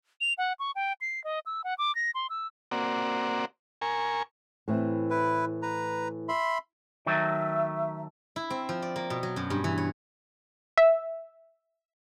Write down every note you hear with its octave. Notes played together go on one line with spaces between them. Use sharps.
F7
F#5
C#6
G5
C7
D#5
E6
F#5
D6
A#6
C6
E6
A#3 C4 F#4 D5
A#4 G#5 C#6
A2 E3 C4
E4 B4
B4 A#5
E5 B5 C6
D#3 F#3 A3 E5
E4
C4
F3
D5
A#3
B2
F#3
F#2
G2
E3
C#5
E5